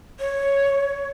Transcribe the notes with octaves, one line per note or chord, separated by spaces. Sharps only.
C#5